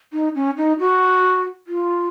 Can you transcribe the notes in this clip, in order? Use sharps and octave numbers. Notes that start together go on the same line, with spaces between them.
D#4
C#4
D#4
F#4
F4